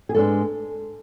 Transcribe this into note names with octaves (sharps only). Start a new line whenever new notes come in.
G#4
G#2 G#3 B3 D4 A4